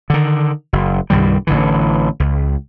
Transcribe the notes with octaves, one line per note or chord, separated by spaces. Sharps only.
D3 D#3
F#1
C2 G2 D#3 G3
A1 D3 E3
C#2